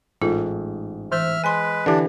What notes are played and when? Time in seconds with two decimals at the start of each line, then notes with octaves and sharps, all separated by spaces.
0.22 A1 G#2 F4 A4
1.12 E3 C5 E5 F6
1.44 G#3 B4 G#5 C6
1.86 D3 E3 D4 G4 B4